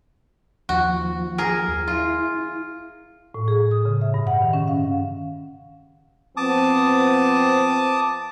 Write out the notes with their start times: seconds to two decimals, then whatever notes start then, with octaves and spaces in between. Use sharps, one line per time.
0.69 D#2 F3 F#4
1.38 G#4 A#4
1.88 E4 F4
3.34 A2
3.48 G#4
3.71 D#6
3.85 C#3
4.01 E5
4.14 G2
4.27 F#5
4.42 D#3
4.53 C#4
4.68 F5
6.37 F3 B3 C4 A5 D6 D#6